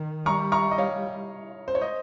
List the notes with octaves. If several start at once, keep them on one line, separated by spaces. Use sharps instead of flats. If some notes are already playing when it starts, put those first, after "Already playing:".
Already playing: D#3
G3 A#5 C#6
A#5 C#6
D#5
C#5 F5
C5
C#5
C5 D#5